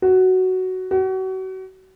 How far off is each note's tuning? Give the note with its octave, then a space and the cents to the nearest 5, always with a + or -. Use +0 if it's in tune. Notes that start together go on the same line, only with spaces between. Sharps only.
F#4 +10
F#4 +35